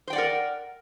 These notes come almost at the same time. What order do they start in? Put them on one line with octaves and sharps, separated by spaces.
C5 G5 D5 F#5 A#4